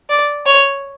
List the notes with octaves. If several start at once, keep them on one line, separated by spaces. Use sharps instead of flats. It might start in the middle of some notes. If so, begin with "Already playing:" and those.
D5
C#5